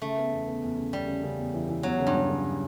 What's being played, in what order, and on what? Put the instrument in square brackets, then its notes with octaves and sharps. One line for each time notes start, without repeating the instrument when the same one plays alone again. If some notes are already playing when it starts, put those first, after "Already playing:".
[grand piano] C#3 [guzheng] A3
[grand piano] B3
E2
B3
E2
C#3
[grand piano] E2 [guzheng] G3
[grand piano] C#3
C#3
E2
E3
E3
[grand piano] E2 [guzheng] F#3
[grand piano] C#3
[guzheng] G2
[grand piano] F#3
C#3